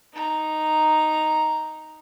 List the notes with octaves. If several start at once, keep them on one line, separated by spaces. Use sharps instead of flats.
D#4 A#5